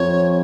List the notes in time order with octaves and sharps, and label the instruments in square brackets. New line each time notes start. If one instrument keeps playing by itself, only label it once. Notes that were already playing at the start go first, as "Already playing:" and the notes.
Already playing: [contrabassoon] F2 [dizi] C#5